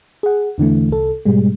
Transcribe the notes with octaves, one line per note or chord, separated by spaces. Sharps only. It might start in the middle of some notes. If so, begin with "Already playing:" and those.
G#4 F#5
E2 D3 E3 A3
C2 A4
G#2 B2 G3 G#3